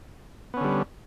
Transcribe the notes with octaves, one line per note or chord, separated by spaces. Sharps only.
D3 G3 B3 C#4